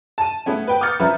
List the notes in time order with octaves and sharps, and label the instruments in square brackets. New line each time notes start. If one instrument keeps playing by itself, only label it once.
[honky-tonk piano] A5 D#7
A3 B3 C#4
B4 G5
D6 D#6 F6 G6 A6 C#7
F3 C#4 B4 E5 A#5